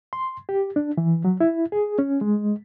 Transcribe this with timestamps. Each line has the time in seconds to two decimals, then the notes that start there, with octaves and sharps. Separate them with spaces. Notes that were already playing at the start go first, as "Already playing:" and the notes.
0.13 C6
0.49 G4
0.76 D4
0.97 E3
1.25 F#3
1.40 E4
1.72 G#4
1.99 C#4
2.21 G#3